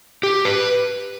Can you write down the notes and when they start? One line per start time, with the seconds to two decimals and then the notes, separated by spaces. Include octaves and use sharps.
0.23 G4
0.45 B4